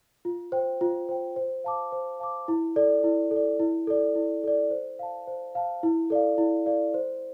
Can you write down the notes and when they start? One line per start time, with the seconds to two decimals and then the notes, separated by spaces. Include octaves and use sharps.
0.25 F4
0.52 C5 G5
0.81 F4
1.09 C5 G5
1.36 C5
1.64 F5 A5 D6
1.92 C5
2.20 F5 A5 D6
2.48 E4
2.76 A4 D5
3.04 E4
3.31 A4
3.36 D5
3.60 E4
3.87 A4 D5
4.15 E4
4.43 A4 D5
4.71 C5
4.99 F5 A5
5.27 C5
5.55 F5 A5
5.83 E4
6.10 A4 D5 F5
6.38 E4
6.66 A4 D5 F5
6.94 C5